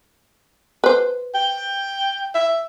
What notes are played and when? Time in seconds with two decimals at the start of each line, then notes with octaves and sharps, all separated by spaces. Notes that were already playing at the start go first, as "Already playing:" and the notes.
0.84 B4 C5
1.35 G5
2.35 E5